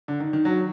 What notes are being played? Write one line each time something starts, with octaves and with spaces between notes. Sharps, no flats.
D3
D#3
D#3
F#3